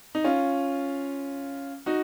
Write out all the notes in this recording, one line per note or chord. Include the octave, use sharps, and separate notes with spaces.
D#4
C#4 F4
D#4 F#4